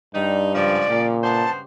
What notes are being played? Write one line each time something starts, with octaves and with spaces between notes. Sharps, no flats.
G2 G3 D#4
G#2 C#3 F3 G#3 D5
A#2 F3 G4
G2 B3 C5 A5